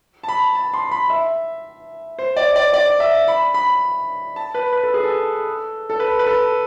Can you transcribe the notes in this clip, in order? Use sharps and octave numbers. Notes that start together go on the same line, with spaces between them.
A5
B5
A5
C6
B5
E5
C5
D5
D5
D5
E5
B5
B5
A5
B4
B4
A4
G#4
A4
A4
B4
B4
A4